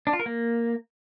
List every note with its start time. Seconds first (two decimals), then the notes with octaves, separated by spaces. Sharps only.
0.07 D4
0.13 F4
0.20 A#4
0.26 A#3